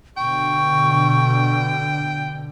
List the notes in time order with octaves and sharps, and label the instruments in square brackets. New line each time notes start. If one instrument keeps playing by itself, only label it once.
[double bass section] B2 D3 [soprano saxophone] G5 [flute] C#6